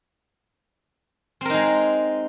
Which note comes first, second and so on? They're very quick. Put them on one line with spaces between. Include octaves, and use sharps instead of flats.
C4 A#4 D#4 G#3